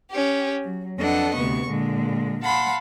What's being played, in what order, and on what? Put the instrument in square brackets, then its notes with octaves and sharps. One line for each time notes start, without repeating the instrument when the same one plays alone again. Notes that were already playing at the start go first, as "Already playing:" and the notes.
[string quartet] C#4 G4
F#3
F2 D4 A4 B4 D#5 F#5
D2 C3 B3 C#6
A#2 D3 G#3
F5 F#5 A5 B5 C6